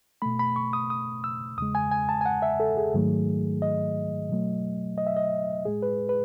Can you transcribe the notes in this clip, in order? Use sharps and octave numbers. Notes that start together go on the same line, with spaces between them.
B2 A3 B5
B5
C#6
D#6
D#6
E6
E2 C#3 G#3 D#6
G#5
G#5
A5
G#5
F#5
E5
A4
G#4
G#2 D#3 F#3 A3
D#5
B2 F#3 A3
D#5
E5
D#5
A2 G#3 G#4
B4
B4